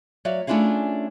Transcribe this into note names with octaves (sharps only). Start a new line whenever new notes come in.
F#3 D5 E5 F5
A3 C#4 D4 E4 F4 G#4